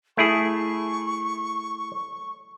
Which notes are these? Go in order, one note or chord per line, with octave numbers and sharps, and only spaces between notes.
A3 E4 G#4 C#6